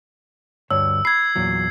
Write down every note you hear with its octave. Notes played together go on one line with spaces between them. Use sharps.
D2 G2 C#5 E6
B5 G#6 C7
E2 A#2 F#3